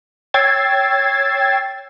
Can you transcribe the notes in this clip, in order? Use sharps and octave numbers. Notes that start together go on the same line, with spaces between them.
C#5 G5 E6 G#6 A6 C7